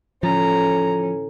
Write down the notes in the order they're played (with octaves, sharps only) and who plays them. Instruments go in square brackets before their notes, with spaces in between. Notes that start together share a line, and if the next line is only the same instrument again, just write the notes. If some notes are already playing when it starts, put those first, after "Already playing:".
[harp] A2 D3 E3 [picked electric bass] F3 [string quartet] C#4 [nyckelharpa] A#5